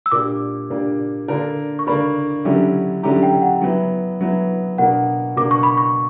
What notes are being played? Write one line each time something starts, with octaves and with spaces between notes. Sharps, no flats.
E6
A#2 A#3 D4 G4 D6
A#2 A#3 D4 G4
D3 A#3 D4 A#4
C#6
D3 A#3 D4 A#4 B5
D3 F#3 C#4 E4 G4
D3 F#3 C#4 E4 G4 A#5
G5
F#5
F#3 B3 E4
F#3 B3 E4
B2 A#3 D4 A#4 F#5
B2 A#3 D4 A#4 D6
C#6
B5
C#6